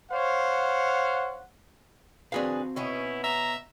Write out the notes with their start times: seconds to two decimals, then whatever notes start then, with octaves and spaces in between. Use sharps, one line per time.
0.11 C5 C#5 F5 F#5
2.32 C4 D4 F#4 G#4 B4 F5
2.76 B2 B3 C#4 E4
3.24 E5 A#5